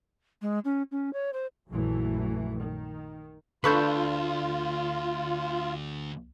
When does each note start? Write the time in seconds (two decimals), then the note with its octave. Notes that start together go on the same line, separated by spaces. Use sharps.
0.42 G#3
0.65 C#4
0.91 C#4
1.13 C#5
1.33 C5
1.70 A#1 F#2 A#2 E3 F#3 A3
2.59 D#3
3.64 D2 D4 F4 A4 B4 B5 C#6 G6